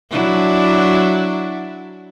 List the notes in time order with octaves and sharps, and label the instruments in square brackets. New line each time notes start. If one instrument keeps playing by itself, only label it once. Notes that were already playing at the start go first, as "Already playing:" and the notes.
[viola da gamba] F#3 D4 E4